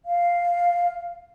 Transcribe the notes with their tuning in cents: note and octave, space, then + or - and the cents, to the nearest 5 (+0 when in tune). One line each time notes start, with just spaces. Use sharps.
F5 +0